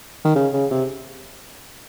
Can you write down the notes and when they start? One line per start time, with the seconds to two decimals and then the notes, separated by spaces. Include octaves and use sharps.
0.25 D#3
0.35 C#3
0.53 C#3
0.71 C3